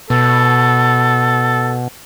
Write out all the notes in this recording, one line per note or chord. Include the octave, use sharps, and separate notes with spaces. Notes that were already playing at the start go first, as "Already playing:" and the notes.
B2 A4